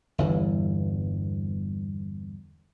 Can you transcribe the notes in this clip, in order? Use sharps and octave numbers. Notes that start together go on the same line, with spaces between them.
G1 E2 G2 E3